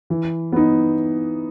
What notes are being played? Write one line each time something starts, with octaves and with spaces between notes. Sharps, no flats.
E3
B3 D#4